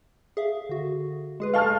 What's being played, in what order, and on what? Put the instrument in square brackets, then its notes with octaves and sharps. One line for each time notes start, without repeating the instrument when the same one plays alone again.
[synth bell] G#4 E5 F5
D3 F#4
G#3 G#4 B4
[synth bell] A4 D#5 C#6 [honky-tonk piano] F5 A5 F6